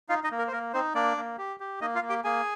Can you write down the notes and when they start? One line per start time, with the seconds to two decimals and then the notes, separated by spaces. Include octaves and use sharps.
0.09 D#4 F4 F5
0.24 D#4 D#5
0.31 A#3
0.39 A#4
0.47 C5
0.53 A#3 A#4
0.73 C4 D#4 C5
0.95 A#3 D4 D5
1.17 A#3
1.38 G4
1.60 G4
1.81 A#3 D#4 D#5
1.95 F4 F5
2.02 A#3
2.09 G4 G5
2.24 A#3 G#4 G#5